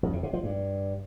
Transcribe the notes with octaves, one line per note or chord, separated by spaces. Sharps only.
F2
C3
C3
F3
G2